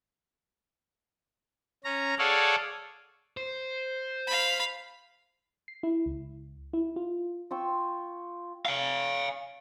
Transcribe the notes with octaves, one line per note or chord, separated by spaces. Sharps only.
C#4 A#5
G#4 A4 C#5 D5 F5 F#5
C5
F5 B5
C7
E4
C#2
E4
F4
F4 G5 C#6 E6
F5 G#5